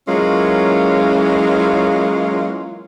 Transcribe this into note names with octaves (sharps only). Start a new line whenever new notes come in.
E3 F#3 G#3 A#3 C#4 F4